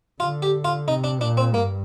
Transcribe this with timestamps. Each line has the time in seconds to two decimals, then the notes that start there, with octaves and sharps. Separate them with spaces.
0.20 D3 F4
0.42 G4
0.65 F4
0.88 C3 D#4
1.04 D4
1.21 A#2 D4
1.37 C4
1.54 G2 A#3